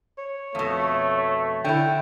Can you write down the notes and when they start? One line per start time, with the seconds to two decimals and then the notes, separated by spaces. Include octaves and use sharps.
0.18 C#5
0.55 F2 B2 A3
1.18 C#5
1.65 D3 E4 G5